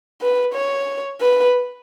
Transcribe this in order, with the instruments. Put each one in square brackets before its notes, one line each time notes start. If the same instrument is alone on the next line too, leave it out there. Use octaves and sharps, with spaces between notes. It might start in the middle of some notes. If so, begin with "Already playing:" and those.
[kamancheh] B4
C#5
B4